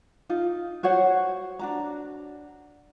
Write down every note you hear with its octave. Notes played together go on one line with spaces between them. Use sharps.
D#4 F4
F#4 C5 C#5 F#5
D4 F#4 A#5